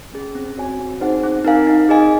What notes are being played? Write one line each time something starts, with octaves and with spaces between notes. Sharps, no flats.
C#4 G#4
C4
F#4 C#5 G#5
C4
D#4 G#4 C5 F#5
C4
D#4 A#4 F5 G#5
D#4
G#4 D#5 G#5